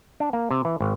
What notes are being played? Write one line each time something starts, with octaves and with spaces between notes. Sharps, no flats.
D4
A#3
C3
E3
G#1